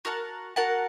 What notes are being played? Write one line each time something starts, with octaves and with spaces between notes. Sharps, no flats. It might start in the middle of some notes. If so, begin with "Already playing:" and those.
F#4 A#4 F#5 A5
F#4 A#4 F#5 A5